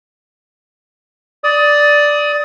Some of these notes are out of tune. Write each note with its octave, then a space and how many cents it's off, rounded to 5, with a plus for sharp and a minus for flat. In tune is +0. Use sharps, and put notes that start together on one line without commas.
D5 +0 D#6 +20